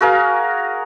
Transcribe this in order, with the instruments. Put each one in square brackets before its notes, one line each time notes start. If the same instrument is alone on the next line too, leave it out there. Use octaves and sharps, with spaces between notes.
[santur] F#4 G#4 A#4 F5